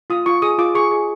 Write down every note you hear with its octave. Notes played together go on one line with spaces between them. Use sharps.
F4 D#6
F4 C#6
G#4 D#6
F4 D6
G#4 C#6
G#4